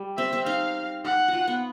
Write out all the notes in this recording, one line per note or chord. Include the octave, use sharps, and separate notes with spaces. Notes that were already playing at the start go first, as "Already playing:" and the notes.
Already playing: G3
C4 E5
C4
D#4 F5
D#4 F#5
F#4
F4
B3